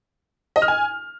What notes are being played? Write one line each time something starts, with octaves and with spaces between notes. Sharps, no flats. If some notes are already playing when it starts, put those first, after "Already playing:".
D#5
F6
G#5